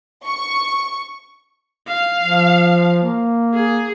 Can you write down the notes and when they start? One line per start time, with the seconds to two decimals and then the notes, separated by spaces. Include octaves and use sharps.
0.25 C#6
1.87 F5
2.21 F3
3.03 A#3
3.54 G#4